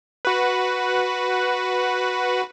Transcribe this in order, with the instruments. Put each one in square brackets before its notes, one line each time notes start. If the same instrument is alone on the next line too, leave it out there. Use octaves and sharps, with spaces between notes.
[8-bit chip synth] F#4 B4